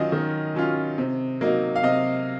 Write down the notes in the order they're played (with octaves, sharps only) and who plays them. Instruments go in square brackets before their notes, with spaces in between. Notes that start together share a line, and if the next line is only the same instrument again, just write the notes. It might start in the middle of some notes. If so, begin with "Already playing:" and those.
Already playing: [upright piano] D#3 F#3 C#4 F4 D#5
D#3
F#3 C#4 F4
C3
F#3 A#3 D#4
F5
C3 D#5